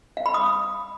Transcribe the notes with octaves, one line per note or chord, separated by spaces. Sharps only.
F5
B5
D#6